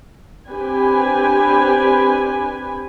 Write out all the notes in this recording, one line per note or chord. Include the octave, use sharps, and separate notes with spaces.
C4 D4 G4 B4 G#5